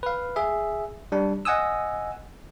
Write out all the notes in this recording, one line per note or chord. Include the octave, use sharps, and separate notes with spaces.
B4 F5
G#4 E5
G3 D4
D#5 F#5 G#5 D#6 E6